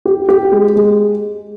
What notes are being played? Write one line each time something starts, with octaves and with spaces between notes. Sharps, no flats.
G4
G4
G#3
G#3